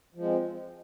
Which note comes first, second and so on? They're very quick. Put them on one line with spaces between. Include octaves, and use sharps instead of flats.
F3 G#3 C4